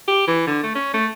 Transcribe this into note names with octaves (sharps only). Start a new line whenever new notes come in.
G4
E3
D3
A3
C#4
A3